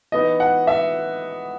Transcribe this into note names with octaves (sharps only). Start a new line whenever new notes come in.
E3 B3 D#4 D#5
F#5
E5